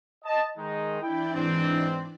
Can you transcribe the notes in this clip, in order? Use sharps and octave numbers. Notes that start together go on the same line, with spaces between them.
D#5 A5
D#3 G#3 D#4
E3 D4 E4 D5 G5
G#2 C4